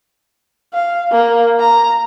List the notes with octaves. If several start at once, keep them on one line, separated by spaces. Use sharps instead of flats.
F5
A#3
A#5